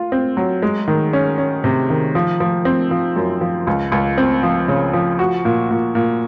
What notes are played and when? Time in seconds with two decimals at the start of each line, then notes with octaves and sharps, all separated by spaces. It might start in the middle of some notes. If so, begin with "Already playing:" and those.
Already playing: F4
0.12 C4
0.37 F#3
0.62 G#3
0.88 D#3
1.13 C#4
1.38 C#4
1.64 C3
1.90 D#3
2.15 F3
2.40 F3
2.65 C4
2.91 F3
3.16 F#2
3.41 F3
3.67 C#2
3.92 C#2
4.18 C4
4.43 F3
4.68 C#3
4.93 F3
5.19 F#4
5.45 A#2
5.70 A#2
5.95 A#2